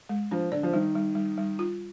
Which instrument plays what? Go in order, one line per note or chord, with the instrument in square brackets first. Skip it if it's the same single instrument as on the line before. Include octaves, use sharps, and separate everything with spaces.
[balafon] G#3
[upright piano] F3 [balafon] D4
[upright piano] D3 [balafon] D5
[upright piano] F3
[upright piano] D#3 [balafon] G3
[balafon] G3
G3
G3
F4